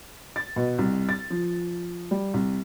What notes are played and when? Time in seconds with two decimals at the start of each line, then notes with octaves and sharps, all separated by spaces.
0.36 A6
0.56 B2
0.78 C2
1.09 A6
1.30 F3
2.11 G3
2.34 C2